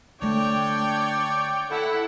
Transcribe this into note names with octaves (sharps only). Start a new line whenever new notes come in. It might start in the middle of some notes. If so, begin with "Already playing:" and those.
D3 A3 D4 C#5 D5 G5
E4 A4 F#5